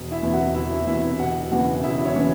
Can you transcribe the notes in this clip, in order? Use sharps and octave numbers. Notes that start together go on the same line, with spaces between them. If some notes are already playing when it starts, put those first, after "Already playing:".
Already playing: E1
E4 E5
E2 C3
F#4 F#5
E1 E4 E5
E2 C3 E4 E5
E1 F#4 F#5
E2 C#3 E3 F#4 F#5
E1 E4 E5
C#4 C#5
C#3 E3